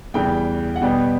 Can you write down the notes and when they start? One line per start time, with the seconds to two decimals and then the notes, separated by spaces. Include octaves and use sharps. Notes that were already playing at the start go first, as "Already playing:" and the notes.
0.14 E2 C#3 E3 G3 G5
0.76 F#5
0.82 B2 G3 B3 G5